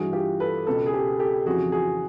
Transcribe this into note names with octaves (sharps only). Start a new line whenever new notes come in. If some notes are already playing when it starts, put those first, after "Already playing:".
Already playing: G2 E3 F#4 G#4
F4 G4
A4 B4
C#2 B2 A4 B4
G#4
G4 A4
G4 A4
F2 C#3 E3 F#4 G#4
F#4 G#4